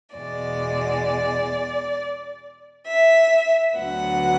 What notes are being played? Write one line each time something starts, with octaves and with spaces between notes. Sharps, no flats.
E2 B2 G#3 D5
E5
D2 D3 F#3 B3 F#5